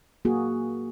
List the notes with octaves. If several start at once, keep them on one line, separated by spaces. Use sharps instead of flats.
A#3 F#4 G#4